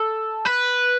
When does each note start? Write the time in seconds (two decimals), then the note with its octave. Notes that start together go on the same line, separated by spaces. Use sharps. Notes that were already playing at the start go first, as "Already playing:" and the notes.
Already playing: A4
0.45 B4